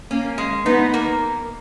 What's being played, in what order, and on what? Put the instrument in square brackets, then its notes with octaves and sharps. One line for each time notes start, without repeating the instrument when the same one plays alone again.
[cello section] A#3 [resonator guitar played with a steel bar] C#4
[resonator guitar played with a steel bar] G#3
[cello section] B3 [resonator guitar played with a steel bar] D#4
[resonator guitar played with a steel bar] A#3